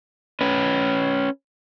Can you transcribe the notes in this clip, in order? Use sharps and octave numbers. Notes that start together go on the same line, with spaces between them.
C#4 B4